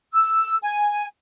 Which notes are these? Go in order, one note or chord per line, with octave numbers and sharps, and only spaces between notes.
E6
G#5